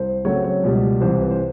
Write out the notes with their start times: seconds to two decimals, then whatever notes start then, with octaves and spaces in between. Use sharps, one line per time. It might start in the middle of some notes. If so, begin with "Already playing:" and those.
Already playing: C2 C5
0.25 C#3 F#3 A3 C4 C#5
0.44 C#5
0.63 C#2 B2 G3
1.01 C2 C3 E3 C5
1.21 B4
1.31 C5